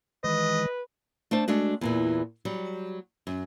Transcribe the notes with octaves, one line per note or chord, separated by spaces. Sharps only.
D#3 E3 G#3 B4 D#5
A3 D4 C5 A5
G#3 A3 D4 F#4
E2 A#2 E3
F#3 G3
F#2